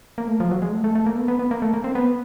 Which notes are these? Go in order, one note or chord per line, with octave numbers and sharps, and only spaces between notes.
A#3
A3
F3
F#3
G#3
A3
A3
A3
A#3
B3
B3
B3
A#3
A3
A#3
C4
B3